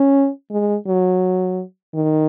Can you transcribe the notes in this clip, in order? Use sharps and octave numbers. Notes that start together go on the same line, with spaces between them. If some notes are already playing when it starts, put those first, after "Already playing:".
Already playing: C#4
G#3
F#3
D#3